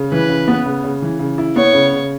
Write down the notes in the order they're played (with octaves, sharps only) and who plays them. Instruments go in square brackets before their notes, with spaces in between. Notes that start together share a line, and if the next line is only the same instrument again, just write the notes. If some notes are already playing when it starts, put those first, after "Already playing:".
Already playing: [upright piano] C#3
[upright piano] E3 [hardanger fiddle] B4
[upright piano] C#3
B3
C#3
C#3
E3
C#3
E4
[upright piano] B3 [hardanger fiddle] C#5
[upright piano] C#3
C#3